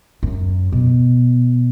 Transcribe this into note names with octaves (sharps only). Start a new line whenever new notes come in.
F#2
B2